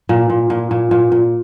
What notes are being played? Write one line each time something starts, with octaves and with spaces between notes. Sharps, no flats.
A#2
A#2
A#2
A#2
A#2
A#2